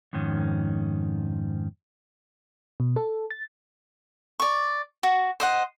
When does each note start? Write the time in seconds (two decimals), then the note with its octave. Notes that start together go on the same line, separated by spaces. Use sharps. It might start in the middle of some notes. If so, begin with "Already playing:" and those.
0.13 F2 G#2 D#3 C#4
2.80 B2
2.96 A4
3.31 A6
4.40 D5 C#6
5.03 F#4
5.40 C5 D#5 F#5